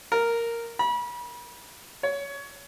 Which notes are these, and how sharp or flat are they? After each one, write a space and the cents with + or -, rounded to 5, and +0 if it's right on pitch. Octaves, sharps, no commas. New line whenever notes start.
A#4 -5
B5 -35
C#5 +20